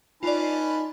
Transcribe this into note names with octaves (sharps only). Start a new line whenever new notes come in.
C#4 D#4 F4 B4 D5 A5